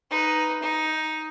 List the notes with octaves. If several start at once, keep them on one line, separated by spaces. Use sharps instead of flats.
D#4 B4
D#4